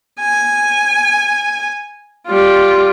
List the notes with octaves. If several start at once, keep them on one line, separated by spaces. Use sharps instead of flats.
G#5
G3 F4